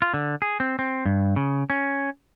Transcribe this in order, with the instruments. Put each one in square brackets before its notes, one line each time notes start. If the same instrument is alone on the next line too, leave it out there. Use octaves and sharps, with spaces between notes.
[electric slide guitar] F4
D3
G#4
C4
C4
G2
C#3
C#4